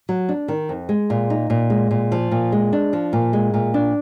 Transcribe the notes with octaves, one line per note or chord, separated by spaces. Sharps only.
F#3
D4
D#3
F2
G#3
A#2
D#4
A#2
G#3
A#2
F3
A#2
G#3
D4
F3
A#2
G#3
A#2
D4